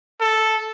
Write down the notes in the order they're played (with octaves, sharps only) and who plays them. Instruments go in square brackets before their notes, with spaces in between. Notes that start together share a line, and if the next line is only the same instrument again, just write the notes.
[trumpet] A4